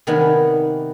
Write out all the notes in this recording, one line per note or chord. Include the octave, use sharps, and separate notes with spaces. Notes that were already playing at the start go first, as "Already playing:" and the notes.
C3 D#3 G3 B3 F#5 G#5